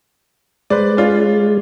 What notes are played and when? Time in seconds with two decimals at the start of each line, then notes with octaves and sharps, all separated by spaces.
0.70 G#3 B4 C5 D5
0.97 C#4 F4 D5